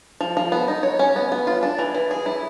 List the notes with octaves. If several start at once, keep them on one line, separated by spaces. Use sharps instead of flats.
F3
F3
B3
D#4
C#5
C#4
B3
B3
F4
D4
E3
E3
G#4
E4